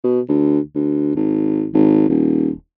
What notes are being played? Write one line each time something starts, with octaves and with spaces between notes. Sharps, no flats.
B2
D2
D2
G#1
G#1
D#1